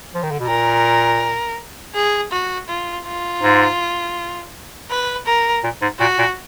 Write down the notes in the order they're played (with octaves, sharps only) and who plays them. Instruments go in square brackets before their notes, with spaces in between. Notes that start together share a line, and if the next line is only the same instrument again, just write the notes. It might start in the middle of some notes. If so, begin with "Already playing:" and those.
[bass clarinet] F3
D#3
D3
B2
[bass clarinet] A#2 [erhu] A#4
[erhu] G#4
F#4
F4
F4
[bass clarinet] G#2
[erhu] B4
A#4
[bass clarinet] A#2
G#2
[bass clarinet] A#2 [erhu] F#4
[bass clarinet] A#2